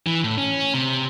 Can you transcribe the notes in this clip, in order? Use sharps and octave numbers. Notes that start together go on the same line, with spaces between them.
E3
A2
C#4
C3